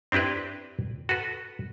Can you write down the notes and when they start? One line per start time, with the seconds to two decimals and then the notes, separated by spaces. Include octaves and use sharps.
0.12 C4 D4 E4 G4 B4
1.09 F#4 A4 B4